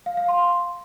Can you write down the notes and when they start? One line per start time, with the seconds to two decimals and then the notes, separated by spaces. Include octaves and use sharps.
0.06 F5
0.17 F5
0.28 C6